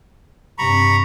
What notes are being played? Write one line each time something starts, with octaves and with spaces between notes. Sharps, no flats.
G2 C3 A#5 B5 C#6